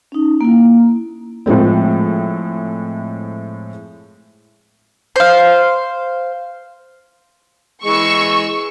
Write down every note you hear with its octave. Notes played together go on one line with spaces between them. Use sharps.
C#4 D#4
A#3 E4
A2 F3 G#3 C4
C5 F5
E3 G#3 C#6 E6